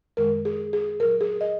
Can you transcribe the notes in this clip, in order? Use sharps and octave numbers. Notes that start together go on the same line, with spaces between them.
F#2 D#3 G#3 A#4
G#4
G#4
A#2 F#3 A#4
G#4
D#5